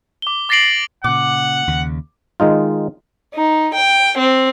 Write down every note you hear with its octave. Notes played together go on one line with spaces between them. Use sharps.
D6 G7
D6 A6 A#6 C7 D7 F#7
A#2 C#3 F#5 D6
D#2 C#3
D#3 G#3 D#4 F4
D#4
G5
C4